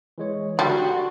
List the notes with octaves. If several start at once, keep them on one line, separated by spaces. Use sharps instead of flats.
E3 G#3 C#5
D3 G3 D4 F#4 C6